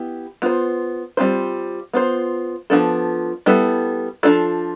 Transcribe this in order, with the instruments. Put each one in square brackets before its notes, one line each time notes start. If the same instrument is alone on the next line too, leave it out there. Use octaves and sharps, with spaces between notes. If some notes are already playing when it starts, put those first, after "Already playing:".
Already playing: [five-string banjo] B3 E4 G4
B3 F4 C5
G3 C4 F4 C5
B3 F4 C5
F3 B3 D4 A4
G3 B3 E4 A4
F3 B3 D4 F4 A4